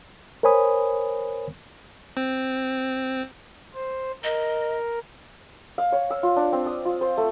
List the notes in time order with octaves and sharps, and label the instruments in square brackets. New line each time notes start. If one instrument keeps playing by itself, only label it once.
[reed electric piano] A#4 C5 C#5 G#5 B5 D#6
[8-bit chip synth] C4
[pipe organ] C5
[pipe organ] A#4 [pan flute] D#5
[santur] F5
C#5
E6
F4
D4
C4
D#6
F4
C5
A3